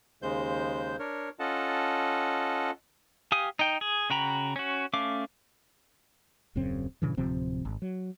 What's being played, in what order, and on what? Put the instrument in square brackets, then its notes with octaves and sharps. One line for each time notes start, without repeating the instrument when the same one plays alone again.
[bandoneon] D#2 C#3 G#3 C5 G6
D4 A#4 C#5
C#4 F4 A4 D#5 F#5 A5
[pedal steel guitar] G4 F5 G#5 D#6
D#4 G5
G#4
C#3 F#4 G5 A#5 B5
C#4 F#4
A3 C#4 F5 D6
[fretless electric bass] D#1 F#2 C#3 C4
G2 A#2 C#3 E3
D1 C3 F3 C4
G#1
F#3